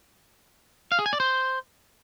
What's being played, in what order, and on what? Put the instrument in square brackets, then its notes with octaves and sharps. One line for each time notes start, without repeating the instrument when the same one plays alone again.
[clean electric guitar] F5
G#4
G#5
D5
C5